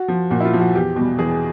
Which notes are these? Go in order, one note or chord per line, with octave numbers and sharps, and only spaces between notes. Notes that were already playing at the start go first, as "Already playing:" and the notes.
Already playing: F#4
F3
A#2 F#4
E4
F4
F3
F#4
E2 G4
B2 G3
E2 G#4